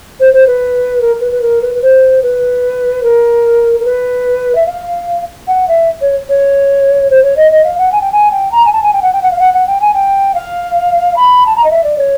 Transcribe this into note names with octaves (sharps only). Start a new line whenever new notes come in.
C5
C5
B4
A#4
B4
B4
A#4
B4
B4
C5
B4
A#4
A#4
B4
E5
F5
F#5
E5
C#5
C#5
C5
C#5
D#5
D#5
F5
F#5
G#5
G5
G#5
G5
A#5
G#5
A5
G#5
G5
F#5
G5
F#5
F5
F#5
F#5
G5
G#5
G5
F5
B5
A5
A#5
D#5
E5
D5
C#5